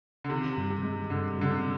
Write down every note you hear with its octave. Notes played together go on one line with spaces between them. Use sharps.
D3
C3 D#3
G2
C3
G#3
G2 D3
G2 D3
C3